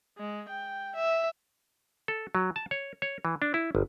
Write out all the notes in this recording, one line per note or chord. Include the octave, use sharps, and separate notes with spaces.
G#3
G5
E5
A4
F#3
A5
C#5
C#5
E3
D4
E4
G1